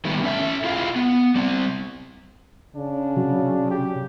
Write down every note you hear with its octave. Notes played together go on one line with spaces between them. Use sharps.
D#3 G3 A3 B3
C#4 A4 E5
E4 F4 G#4 F5
B3
G3 C4
C#3 D4
C3 F#3 F#4
G4